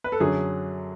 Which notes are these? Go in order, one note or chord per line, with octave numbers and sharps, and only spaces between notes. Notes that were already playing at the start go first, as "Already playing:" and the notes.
B4
A4
F#2 D3 F#3 G#4